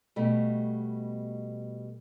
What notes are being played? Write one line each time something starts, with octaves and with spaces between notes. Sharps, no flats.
B2 G3 A3